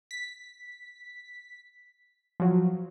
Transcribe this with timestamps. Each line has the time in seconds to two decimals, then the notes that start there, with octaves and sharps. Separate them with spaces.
0.11 B6
2.40 F3 F#3